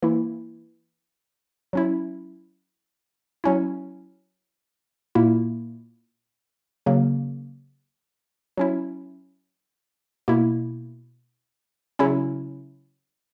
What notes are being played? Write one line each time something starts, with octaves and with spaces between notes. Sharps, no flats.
E3 A#3 E4
F#3 C#4 E4
F#3 C#4 E4
A#2 A#3 E4
C#3 F#3 A#3
F#3 C#4 E4
B2 A#3 E4
C#3 F#3 C#4 E4